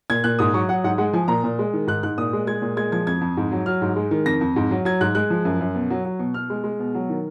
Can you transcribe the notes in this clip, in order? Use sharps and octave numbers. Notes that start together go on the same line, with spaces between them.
A#2 G#6
A#2 F#6
G#2 D#6
F#3 C#6
F#3 F#5
G#2 F#5
G#3 F#5
F3 G#5
A#2 A#5
A#2
G#3
D#3
G#2 F#6
G#2 F#6
A#2 D#6
G#3
G#3 G#6
A#2
G#3 G#6
F3 G#6
F2 G#6
F2
G#2
F#3
F#3 F6
G#2
G#3
D#3
F2 A#6
F2
G#2
F#3
F#3 G#6
G#2 F#6
G#3 F#6
F3
F#2
F#2
B2
F#3
F#3
B2
B2 F6
G#3
G#3
B2
F#3
D#3